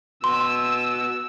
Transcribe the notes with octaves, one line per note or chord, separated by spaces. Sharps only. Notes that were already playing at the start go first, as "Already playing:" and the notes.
B2 C6 E6